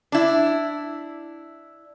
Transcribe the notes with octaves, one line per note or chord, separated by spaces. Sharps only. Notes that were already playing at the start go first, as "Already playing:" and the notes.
D4 E4